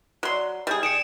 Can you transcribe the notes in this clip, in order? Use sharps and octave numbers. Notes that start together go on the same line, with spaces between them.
F#3 B4 D5 C6
G3 G4 G#4
G2 G#4 C#7 D7 E7